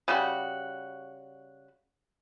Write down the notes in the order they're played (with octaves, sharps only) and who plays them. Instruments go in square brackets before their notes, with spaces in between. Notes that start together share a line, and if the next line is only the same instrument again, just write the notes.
[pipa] C#3 G3 F#4